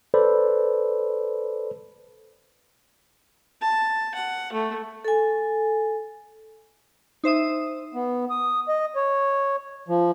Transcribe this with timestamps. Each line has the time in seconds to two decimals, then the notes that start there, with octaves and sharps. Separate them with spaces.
0.14 A4 B4 C5 D5 B5
3.61 A5
4.15 F#5
4.53 A3
5.05 A4 G#5
7.24 D#4 C5 E5 D#6
7.94 B3
8.30 D#6
8.68 D#5
8.95 C#5
9.88 F3